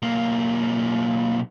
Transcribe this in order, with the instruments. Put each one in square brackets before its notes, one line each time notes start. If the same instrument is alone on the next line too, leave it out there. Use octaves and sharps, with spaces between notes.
[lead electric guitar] B1 A#3